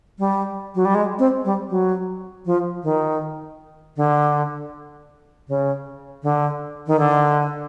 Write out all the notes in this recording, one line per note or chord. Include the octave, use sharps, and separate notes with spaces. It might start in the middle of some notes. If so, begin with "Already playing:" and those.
G3
F#3
G3
G#3
C4
G3
F#3
F3
D#3
D3
C#3
D3
D#3
D3